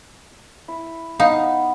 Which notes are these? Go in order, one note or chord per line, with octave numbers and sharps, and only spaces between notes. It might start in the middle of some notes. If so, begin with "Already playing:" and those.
E4
B3 D#4 F5